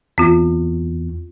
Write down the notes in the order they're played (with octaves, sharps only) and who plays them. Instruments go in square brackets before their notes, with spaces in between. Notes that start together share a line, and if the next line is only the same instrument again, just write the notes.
[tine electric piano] E2 [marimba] C4 F4